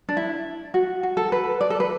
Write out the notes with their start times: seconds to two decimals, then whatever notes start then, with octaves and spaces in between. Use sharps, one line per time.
0.09 D4
0.17 E4
0.74 F#4
1.03 F#4
1.17 A4
1.32 B4
1.61 D5
1.70 A4
1.80 B4